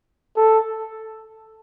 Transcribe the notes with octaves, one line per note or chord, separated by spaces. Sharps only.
A4